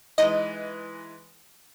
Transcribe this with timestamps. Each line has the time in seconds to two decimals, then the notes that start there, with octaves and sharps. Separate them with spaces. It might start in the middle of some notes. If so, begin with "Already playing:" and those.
0.18 E3 G#3 D#4 D#5